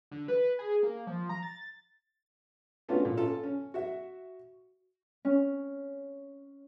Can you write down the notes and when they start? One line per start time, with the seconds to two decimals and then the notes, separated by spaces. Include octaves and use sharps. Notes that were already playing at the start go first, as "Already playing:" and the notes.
0.11 D3
0.28 B4
0.59 G#4
0.83 A#3
1.07 F3
1.29 A#5
1.43 A6
2.89 A3 B3 C#4 D4 F4 F#4
3.05 A#2
3.17 C#4 F4 A4 A5
3.43 C#4
3.74 F#4 E5
5.25 C#4